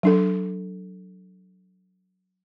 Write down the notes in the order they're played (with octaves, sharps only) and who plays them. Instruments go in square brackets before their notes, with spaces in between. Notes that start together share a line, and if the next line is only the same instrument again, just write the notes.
[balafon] F#3 D4 A4